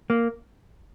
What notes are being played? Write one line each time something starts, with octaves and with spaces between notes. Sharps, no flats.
A#3